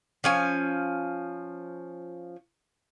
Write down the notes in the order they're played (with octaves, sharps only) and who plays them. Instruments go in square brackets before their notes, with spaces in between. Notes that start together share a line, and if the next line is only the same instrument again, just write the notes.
[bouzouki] F3 C#4 G#5